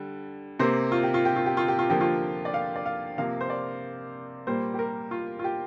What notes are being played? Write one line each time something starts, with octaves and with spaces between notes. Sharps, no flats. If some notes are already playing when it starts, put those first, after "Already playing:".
Already playing: D3 G3
C3 A#3 C5
F4
G4
F4
G4
F4
G4
F4
G4
F4
D3 F3 A#3 G4
F4
D5
F5
D5
F5
C3 F3 A#3 F5
C5
D5
A#2 G3 A#3 C5
G4
A#4
F4
F4
G4